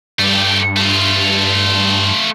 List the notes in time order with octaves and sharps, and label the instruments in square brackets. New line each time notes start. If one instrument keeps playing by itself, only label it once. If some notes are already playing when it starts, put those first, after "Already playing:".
[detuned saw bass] G2 [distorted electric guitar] A3 G4
[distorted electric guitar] A3 F4